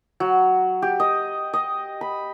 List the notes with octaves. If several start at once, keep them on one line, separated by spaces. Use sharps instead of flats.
F#3
G4
D#5
D#5
B5